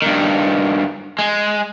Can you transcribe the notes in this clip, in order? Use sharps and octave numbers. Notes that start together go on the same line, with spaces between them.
G2 D#3
G#3